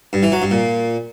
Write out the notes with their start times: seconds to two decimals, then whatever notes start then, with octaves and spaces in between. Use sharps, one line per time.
0.13 G2
0.23 E3
0.32 F#3
0.42 G2
0.51 A#2